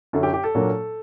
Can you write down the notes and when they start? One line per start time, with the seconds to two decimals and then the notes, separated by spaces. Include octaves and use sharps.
0.13 F#2 D3 F#3 A4
0.23 G4
0.33 G4
0.44 A4
0.55 A#2 F#3 A#3 D4